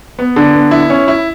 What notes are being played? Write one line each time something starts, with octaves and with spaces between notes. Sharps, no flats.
B3
D3
B3
E4
C#4
E4